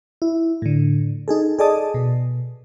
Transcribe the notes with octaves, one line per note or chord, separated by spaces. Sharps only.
E4
A2 D3
D#4 G#4 A4
G#4 A4 D5 D#5 A5 D#6
B2